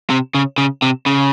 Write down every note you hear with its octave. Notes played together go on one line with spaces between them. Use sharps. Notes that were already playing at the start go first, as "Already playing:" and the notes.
C3
C#3
C#3
C3
C#3